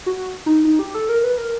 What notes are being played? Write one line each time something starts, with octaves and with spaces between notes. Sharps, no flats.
F#4
D#4
D#4
G4
A4
A#4
B4
A#4